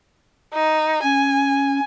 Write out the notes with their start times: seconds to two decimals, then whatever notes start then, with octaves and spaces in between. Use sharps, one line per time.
0.54 D#4
1.03 C#4 G#5